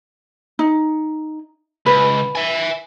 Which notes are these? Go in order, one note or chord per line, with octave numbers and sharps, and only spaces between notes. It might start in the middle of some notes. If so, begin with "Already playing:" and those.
D#4
C#2 B4
E5 G#5